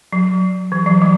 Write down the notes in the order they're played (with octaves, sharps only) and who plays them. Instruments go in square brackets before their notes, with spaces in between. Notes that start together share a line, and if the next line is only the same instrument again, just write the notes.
[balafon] F#3
E3
F#3
G3